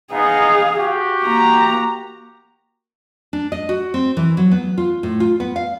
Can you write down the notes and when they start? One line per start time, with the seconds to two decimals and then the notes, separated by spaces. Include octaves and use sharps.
0.12 B3 D#4 G#4 D#5 F5
0.75 F#4 G4
1.23 A#3 A#5
3.33 D4
3.52 D#5
3.69 F#4
3.94 C4
4.17 E3
4.37 F#3
4.51 B3
4.78 F4
5.03 A2
5.20 F4
5.40 B3
5.56 F5